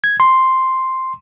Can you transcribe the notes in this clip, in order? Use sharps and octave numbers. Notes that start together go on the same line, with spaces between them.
G#6
C6